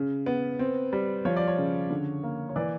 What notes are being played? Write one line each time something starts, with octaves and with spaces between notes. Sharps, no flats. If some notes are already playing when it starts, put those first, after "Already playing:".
Already playing: C#3
B3
C4
G3
F3 C#5
D5
C#5
C#3
D3
A#3
C#5
E3 D5